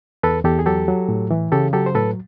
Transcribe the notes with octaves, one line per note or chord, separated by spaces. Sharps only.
E2 A4 B4
E2 G4 A4
G#4
F#3 G4 A4
F#3
A2
E3
C#3 G4 A4
F#3 G4 A4
C5
A2 A4 B4